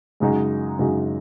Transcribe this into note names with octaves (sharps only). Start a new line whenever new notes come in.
F#2 C#3 G#3 D#4 F#4
F#2 C#3 G#3 D#4 F#4